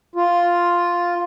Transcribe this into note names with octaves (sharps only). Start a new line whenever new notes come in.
F4